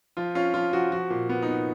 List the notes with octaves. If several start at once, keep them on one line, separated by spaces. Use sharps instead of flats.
F3 F4
C#4 F4
F3 F4
F3 F#4
F3 F#4
A#2
B3
D#4
B3